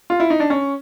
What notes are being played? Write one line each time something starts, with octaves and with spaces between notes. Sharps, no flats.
F4
E4
D#4
D4
C#4